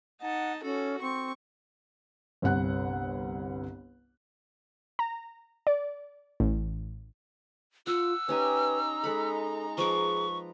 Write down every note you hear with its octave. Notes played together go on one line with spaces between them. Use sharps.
D#4 F#5 A5
C#4 F#4 A4
C4 C#6
G1 C2 F#5 F#6
A#5
D5
A1
F4 F#5 E6
C#4 D#4 G4 B4 G#5 A#5
G#3 A4 F#5 B5
F3 G#4 B4 C#6 D6